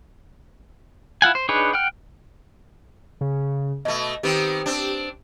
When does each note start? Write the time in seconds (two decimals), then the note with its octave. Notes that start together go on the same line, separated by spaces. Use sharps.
1.22 E4 F4 F#5 G#5
1.35 C5
1.49 D4 D#4 G#4 B4 C#5
1.73 F#5 G5 F6
3.21 C#3
3.85 B2 A3 D#5
4.23 D#3 B3 C4 G4
4.66 C4 D4